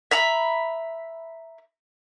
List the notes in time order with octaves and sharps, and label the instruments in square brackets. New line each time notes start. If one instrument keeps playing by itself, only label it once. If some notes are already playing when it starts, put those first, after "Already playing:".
[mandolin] E5 A#5 B5